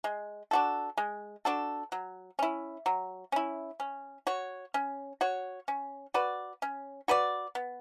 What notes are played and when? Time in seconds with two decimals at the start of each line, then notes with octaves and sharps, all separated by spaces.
0.04 G#3
0.51 D4 F#4 A4
0.97 G#3
1.45 D4 F#4 A4
1.92 F#3
2.39 C#4 E4
2.86 F#3
3.32 C#4 E4
3.80 C#4
4.27 F#4 C#5
4.74 C#4
5.21 F#4 C#5
5.68 C#4
6.14 F#4 B4 D5
6.62 C#4
7.08 F#4 B4 D5
7.55 B3